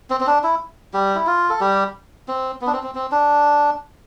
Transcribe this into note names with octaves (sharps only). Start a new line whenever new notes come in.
C4
C4
D4
E4
G3 G4
E4
F4
A4
G3 G4
C4
B3
D4
C4
C4
C4
D4